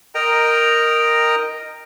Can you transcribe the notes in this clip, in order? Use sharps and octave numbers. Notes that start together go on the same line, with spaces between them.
A#4 D#5 G5 A#5